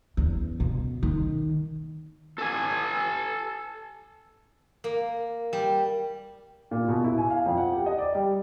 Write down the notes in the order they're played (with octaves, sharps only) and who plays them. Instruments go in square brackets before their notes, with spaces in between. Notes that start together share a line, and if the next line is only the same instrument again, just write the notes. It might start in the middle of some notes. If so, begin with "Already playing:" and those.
[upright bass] E2
B2
D#3
[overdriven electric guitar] A4 G#5
[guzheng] A#3
G3
[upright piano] A#2
B2
E4
G#5
F5
F2
F#5
G4
D#5
D5
G3